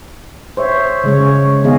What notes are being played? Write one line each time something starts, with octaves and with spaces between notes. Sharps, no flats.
C5 C#5 E5
C#3 G#3 C#5
D#3 B3 G#4 D#5 F5